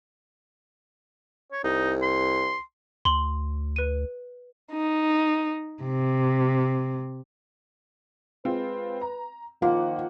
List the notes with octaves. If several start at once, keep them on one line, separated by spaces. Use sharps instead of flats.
C#5
C2 D#4
C6
D2 C6 F#7
B4 D#7
D#4
C3
G#3 C4 F4 B4
A#5
D#3 F3 A#3 F4 F#5